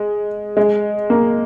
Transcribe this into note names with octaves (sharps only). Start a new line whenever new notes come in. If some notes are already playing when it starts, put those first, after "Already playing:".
Already playing: G#3
G#3
A#3